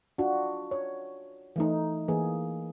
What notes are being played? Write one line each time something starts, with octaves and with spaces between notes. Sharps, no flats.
D4 F4 F#4
C#5
E3 A3 D#4
E3 A#3 G#4